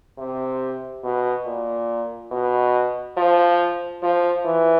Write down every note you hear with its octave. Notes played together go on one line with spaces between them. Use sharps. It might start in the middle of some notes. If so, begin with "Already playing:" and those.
C3
B2
A#2
B2
F3
F3
E3